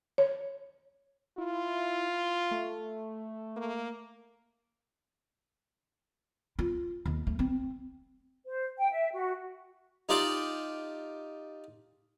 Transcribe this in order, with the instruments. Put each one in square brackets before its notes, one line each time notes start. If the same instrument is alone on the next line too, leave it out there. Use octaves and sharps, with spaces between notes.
[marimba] C#5
[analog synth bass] E4 [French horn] F4
[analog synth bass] A3
[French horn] A#3
[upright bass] F4
D#2
A3
C4
[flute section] C5
G5
E5
F#4
[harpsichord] D#4 F4 G4 D5 F5 A5